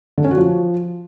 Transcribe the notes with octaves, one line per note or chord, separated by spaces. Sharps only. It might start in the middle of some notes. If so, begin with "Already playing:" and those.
D3
C#4
F#4
F3